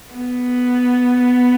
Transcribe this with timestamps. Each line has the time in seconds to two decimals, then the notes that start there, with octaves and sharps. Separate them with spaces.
0.15 B3